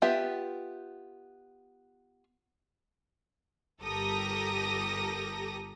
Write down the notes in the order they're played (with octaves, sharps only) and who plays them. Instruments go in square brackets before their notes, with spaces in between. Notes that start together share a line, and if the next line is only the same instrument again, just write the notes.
[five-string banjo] B3 F4 G4 E5 G5
[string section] G1 G4 A4 A#4 D#6 A#6